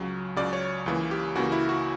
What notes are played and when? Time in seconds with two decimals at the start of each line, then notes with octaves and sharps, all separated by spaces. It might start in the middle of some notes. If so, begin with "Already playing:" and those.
Already playing: C#2 C#3 F#3
0.36 C#2 C#3 F#3 D5
0.53 C#5
0.86 C#2 C#3 E3 A#3
1.11 G4
1.35 C#2 C#3 E3 A#3 F#4
1.52 E4
1.69 F#4